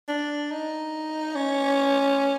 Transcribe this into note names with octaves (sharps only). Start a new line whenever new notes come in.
D4
D#4
C#4